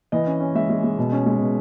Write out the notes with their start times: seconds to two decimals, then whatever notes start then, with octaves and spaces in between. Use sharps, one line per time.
0.12 E3 D#5
0.27 C#4
0.40 C#4
0.55 G#3 E5
0.70 G#3
0.83 G#3
0.98 B2
1.12 C#4
1.26 G#3
1.41 B2